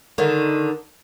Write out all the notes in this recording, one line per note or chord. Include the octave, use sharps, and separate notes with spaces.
D3 D#3